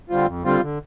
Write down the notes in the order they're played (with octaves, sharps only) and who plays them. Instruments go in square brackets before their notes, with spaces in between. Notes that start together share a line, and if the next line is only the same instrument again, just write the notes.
[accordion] D3 G3 C4 F4
F2
D3 G3 C4 F4
D3